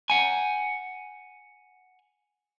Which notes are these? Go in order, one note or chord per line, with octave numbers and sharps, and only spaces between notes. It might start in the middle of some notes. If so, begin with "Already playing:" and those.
F#5 G#5